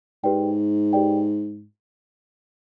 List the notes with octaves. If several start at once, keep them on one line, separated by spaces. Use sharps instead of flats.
G#2 G4 B4 D5 G5
G4 B4 D5 G5